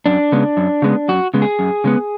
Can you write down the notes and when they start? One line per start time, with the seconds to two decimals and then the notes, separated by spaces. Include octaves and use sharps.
0.06 F#2 D4
0.32 C#3 G#3 B3
0.57 F#2
0.82 C#3 G#3 B3
1.08 F#2 F#4
1.34 C#3 G#3 B3
1.42 G#4
1.59 F#2
1.84 C#3 G#3 B3